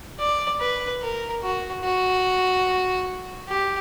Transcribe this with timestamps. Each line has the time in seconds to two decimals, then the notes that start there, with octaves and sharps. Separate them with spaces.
0.19 D5
0.60 B4
1.02 A#4
1.43 F#4
1.84 F#4
3.49 G4